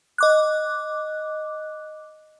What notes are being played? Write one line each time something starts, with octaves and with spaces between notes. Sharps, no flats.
D#5 D6 F#6